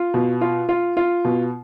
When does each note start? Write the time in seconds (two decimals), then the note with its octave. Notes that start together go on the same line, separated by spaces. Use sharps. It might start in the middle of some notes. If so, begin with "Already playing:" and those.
Already playing: F4
0.14 B2
0.41 F4
0.69 F4
0.97 F4
1.25 B2